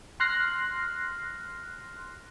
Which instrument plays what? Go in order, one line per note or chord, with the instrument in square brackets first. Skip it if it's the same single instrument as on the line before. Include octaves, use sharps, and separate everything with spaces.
[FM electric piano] C6 F6 F#6 A#6 C7